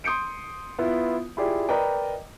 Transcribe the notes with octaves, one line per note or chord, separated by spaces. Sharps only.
C6 D#6 G6 C#7 D7
B3 E4 F4
E4 F4 G4 G#4 D5
A#4 B4 D5 D#5 G5 A#5